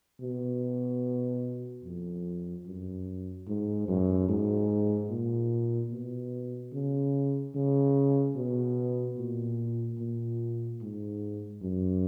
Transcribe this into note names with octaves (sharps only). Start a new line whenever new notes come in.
B2
F2
F#2
G#2
F#2
G#2
A#2
B2
C#3
C#3
B2
A#2
A#2
G#2
F#2